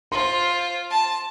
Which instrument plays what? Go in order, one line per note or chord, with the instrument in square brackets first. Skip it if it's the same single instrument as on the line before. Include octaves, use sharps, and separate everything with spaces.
[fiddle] F4 C5 [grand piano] C6
[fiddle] A5